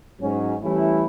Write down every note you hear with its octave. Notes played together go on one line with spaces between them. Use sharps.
G#2 F#3 C#4
E3 G3 A3 C#4 E4